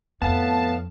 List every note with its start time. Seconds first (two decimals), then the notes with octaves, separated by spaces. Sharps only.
0.22 F2 A2 B3 F5 A5